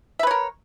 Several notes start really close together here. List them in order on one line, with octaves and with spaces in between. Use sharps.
E5 B4 C#5 A#4